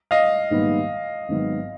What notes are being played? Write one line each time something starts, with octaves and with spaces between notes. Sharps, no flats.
D#5 F5
A#1 G#2 D#3 G3 B3
G#1 G#2 D#3 F#3 B3